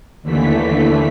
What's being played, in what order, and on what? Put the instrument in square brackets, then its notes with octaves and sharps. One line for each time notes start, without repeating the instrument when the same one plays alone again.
[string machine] D#2 D3 E3 A3 B6